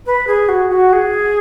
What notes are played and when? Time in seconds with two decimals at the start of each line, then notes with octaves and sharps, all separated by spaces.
0.06 B4
0.27 G#4
0.48 F#4
0.70 F#4
0.92 G#4